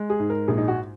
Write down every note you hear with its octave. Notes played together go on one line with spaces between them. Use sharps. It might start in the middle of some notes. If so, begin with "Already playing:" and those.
Already playing: G#3
G#4
G#2
A#4
A#1 G#4
D#4
F#4